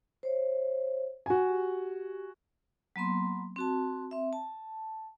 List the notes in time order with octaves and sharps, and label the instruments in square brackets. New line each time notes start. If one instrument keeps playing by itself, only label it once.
[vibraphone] C5 C#5 E5
[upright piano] F#4 G#5
[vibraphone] G4
F#3 A#3 B3 C6
C4 F#4 A5
C4 E5
A5